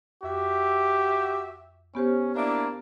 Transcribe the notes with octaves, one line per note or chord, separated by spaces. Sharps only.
F2 F#4 G4 E5
B3 C#4 G4 C5
A#3 D4 E4